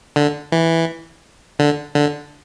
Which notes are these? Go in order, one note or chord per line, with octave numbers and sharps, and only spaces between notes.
D3
E3
D3
D3